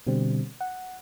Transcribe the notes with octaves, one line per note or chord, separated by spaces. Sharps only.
B2 D3 G3 C4
F#5